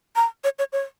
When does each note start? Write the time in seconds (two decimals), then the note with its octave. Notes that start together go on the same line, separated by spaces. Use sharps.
0.16 A#5
0.44 C#5
0.59 C#5
0.73 C#5